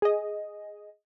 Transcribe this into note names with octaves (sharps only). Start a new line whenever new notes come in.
G#4 D#5